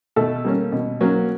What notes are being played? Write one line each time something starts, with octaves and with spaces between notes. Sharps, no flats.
B2 A3 A4
G3 A#3 C#4
B2
F#3 A#3 C#4